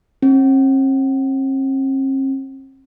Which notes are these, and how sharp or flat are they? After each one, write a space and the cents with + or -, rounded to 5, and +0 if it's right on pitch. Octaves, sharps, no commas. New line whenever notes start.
C4 +45